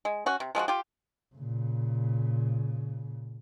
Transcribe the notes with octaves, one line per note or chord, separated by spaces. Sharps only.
G#3
C#4 F#4
C3
F3 G#3 A3 F#4
F4 G4
A#2 C#3